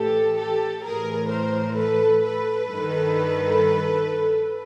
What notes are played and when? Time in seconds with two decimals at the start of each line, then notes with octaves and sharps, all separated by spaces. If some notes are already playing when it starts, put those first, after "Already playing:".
Already playing: A2 E3 G4 A4
0.37 G4 A4
0.84 A2 E3 G#4 A#4
1.30 A#4 C5
1.77 A4 B4
2.23 A4 B4
2.69 G2 D#3